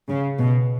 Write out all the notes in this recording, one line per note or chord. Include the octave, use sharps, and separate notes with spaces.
C#3
B2